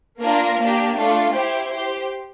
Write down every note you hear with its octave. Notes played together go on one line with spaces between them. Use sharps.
A#3 D4 F4 A#4
A#3 D4 G4
A3 D4 F4
E4 G4 C5 G5
G4 C5 G5